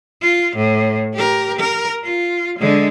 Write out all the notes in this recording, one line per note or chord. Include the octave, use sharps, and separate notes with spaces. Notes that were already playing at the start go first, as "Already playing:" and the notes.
F4
A2
G4 A#4
A#4
F4
D3 G#3